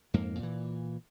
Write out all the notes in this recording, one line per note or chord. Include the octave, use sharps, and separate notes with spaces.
F2 G#2 A#3
A#2 E3